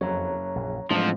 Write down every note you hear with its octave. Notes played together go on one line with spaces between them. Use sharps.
F#1 F2 F#3 C#5 A#5
A#1
A1 F2 A2 F3 F#3 G#3 D4